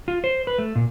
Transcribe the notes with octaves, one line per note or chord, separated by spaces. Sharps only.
F4
C5
B4
A3
A#2